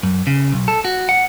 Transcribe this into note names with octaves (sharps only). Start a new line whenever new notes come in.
F#2
C#3
B1
A4
F#4
F#5